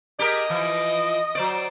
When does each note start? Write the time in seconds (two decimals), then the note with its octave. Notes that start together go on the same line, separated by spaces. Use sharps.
0.19 G4 G#4 A#4 D#5
0.50 E3 F3
1.35 F#3 C5 D5